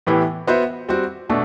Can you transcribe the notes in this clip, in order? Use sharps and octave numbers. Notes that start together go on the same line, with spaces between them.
A2 E3 B3 E4 G4
B3 F#4 C5 E5
G3 C4 F#4
B2 A3 D4